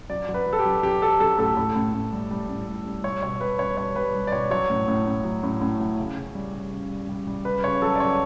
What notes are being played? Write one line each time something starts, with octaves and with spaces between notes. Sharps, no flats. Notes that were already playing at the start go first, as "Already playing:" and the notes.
F#3 D5
F#3
B4
F#3
A4
G4
F#3
F#3 G4
F#3 A4
F#3 A4
A2 A4
A2
A2
A2
G3
G3
A2
G3
G3
G3 C#5
B2 C#5
G3 B4
G3 C#5
G3 C#5
G3 B4
G3
D5
B2 C#5
F#3 C#5
A2
A2
A2
F#3
A2
A2
F#3
C#3
C#3
G3
G3
C#3
G3
G3
G3
C#3 B4
C#3 C#5
F#3 A4
D5
F#3 C#5